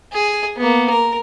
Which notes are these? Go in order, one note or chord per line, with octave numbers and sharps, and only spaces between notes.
G#4
A#3 B3
A#4